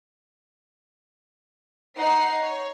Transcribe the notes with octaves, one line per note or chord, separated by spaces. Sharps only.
D#4 F#5 C7
C#5